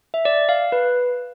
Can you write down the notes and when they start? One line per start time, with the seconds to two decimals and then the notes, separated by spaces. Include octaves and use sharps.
0.14 E5
0.25 D5
0.49 F5
0.72 B4